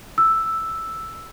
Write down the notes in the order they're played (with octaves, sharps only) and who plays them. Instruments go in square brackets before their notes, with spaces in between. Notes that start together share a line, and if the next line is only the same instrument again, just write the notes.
[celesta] E6